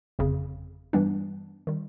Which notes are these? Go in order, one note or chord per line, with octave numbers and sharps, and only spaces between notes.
G1 F2 C#3
G2 E3 G3 B3 D4
D#3 G3